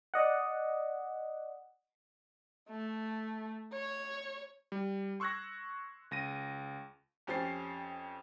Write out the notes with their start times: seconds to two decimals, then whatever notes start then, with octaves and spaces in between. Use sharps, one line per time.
0.14 D5 D#5 F#5
2.70 A3
3.74 C#5
4.72 G3
5.20 C6 C#6 E6 F#6 G#6 A#6
6.11 C#2 A#6 D#7
7.27 F2 C#4 G4 C5 A6 C7